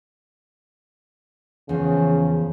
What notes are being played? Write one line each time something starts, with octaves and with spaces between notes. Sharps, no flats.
E2 C#3 F3